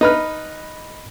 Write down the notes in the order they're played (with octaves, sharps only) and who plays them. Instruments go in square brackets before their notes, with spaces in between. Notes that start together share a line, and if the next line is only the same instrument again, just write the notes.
[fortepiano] D#4 B4 F6